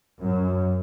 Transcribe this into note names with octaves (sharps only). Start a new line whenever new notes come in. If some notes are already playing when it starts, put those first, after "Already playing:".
F#2